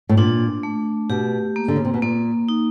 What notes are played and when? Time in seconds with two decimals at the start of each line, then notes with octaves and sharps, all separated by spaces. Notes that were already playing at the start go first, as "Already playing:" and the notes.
0.09 A2
0.17 A#2 D4
0.63 A3
1.10 B2 G4
1.56 A#3
1.68 D3
1.76 C#3
1.85 C3
1.94 B2
2.02 A#2 A#3
2.49 D#4